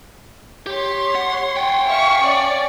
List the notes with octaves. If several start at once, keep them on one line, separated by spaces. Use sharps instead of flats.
G4 C#5 C6
F#5
F#5 G5
E5 F5 C#6
C#4 D5